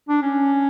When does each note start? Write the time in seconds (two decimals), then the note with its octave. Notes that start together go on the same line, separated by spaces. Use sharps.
0.09 D4
0.22 C#4